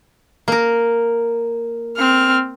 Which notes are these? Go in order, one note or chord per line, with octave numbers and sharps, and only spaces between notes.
A#3 A#4
C4 F6